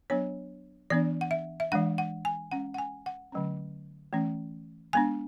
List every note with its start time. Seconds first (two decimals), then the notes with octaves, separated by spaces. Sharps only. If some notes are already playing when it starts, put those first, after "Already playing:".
0.10 F#3 B3 D4 C#5
0.90 E3 B3 D4 D5
1.21 F#5
1.31 E5
1.60 E5
1.72 E3 G#3 D4 F#5
1.98 F#5
2.25 G#5
2.51 G#3 C#4 F#5
2.74 F#5
2.78 G#5
3.06 F#5
3.32 D3 F#3 A3 C#4
4.13 E3 A3 C#4
4.93 G#3 B3 D4 G#5